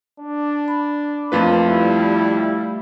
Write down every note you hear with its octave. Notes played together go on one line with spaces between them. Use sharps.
D4
B5
F2 A3 A#3 F4 B4 F5
G3 E4